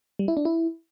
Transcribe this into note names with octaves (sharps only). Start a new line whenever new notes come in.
G3
E4
D4
E4